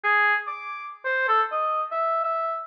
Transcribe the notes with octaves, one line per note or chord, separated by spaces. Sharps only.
G#4
D6
C5
A4
D#5
E5
E5